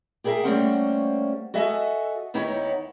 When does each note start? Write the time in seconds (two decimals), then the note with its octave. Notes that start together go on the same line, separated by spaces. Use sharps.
0.24 G4 G#4 A#4 B4 E5 G#5
0.44 G3 A3 A#3 C#4 C5 F#5
1.54 F#4 A4 D#5 E5 G#5
2.34 D#2 B3 D#4 E4 C#5